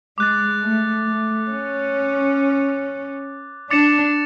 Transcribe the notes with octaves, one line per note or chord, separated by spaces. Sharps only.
G#3 D6 F#6 A6
A3
A3
C#4
D4 D6 A6 C#7 E7